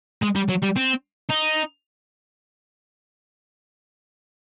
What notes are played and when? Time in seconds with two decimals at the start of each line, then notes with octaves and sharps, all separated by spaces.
0.23 G#3
0.36 G3
0.49 F#3
0.62 G3
0.76 C4
1.29 D#4